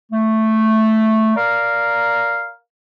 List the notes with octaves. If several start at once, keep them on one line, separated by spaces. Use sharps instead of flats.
A3
A#4 D5 F5 A#5